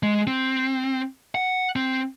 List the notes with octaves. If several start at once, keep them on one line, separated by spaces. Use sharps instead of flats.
G#3
C4
F#5
C4